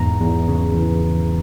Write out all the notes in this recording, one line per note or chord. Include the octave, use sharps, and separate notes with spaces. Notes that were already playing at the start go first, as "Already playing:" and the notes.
Already playing: E2 G#2 A#5
E2
C#3
E3